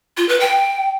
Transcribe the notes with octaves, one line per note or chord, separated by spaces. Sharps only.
F4
B4
G5